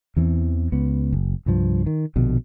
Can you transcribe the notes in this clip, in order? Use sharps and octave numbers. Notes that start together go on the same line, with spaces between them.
E2 E3 C4
C#2 B3
F#1
C2 G2 F3
D#3
A#1 B2 D3